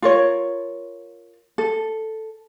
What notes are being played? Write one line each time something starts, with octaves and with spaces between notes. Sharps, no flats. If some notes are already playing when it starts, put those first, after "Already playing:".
F4 A#4 C#5
A4